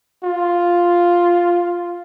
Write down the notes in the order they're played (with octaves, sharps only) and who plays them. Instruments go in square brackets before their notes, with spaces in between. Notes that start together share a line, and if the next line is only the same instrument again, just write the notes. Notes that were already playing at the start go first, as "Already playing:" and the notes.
[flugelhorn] F4